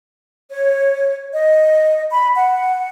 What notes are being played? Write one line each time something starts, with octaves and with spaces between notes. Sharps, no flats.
C#5
D#5
B5
F#5